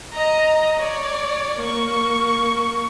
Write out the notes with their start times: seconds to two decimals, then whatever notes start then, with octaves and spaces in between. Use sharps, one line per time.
0.13 D#5 A#5
0.80 C#5 D5
1.60 A#3 C#6